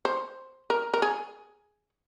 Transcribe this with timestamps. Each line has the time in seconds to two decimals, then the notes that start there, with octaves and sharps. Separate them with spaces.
0.05 C5
0.70 A#4
0.94 A#4
1.02 G#4